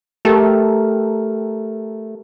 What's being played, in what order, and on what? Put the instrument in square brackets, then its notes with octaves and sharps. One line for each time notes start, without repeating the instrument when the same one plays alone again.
[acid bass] A3 [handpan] G4 A4 A#4